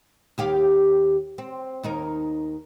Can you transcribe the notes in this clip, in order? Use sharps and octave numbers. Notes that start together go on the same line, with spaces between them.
D#2 G4 F5
C4
D#2 D#4 A#4